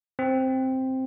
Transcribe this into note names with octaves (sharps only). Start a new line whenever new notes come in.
C4